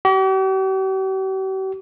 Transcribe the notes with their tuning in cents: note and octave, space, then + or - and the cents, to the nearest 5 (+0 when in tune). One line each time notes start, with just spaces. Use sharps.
G4 -45